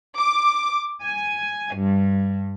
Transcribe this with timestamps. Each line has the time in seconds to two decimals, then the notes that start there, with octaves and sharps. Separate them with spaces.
0.16 D6
1.03 G#5
1.76 G2